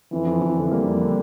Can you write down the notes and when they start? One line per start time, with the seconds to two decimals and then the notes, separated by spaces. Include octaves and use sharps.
0.12 F2 E3
0.27 F2
0.41 F2
0.57 D3
0.71 G3 A#3
0.86 F2
1.02 D3